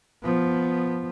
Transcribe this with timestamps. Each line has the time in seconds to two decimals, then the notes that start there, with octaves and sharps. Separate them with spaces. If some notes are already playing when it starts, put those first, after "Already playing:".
0.23 F3 B3